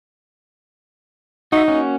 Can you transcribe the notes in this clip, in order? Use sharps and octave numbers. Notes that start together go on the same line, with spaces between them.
D#4 F#4 E5
A#3 C#4 F#4